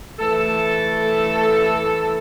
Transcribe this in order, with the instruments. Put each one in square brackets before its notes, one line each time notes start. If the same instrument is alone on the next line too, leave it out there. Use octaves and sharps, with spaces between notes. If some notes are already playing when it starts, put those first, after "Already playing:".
[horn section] E3 A3 A4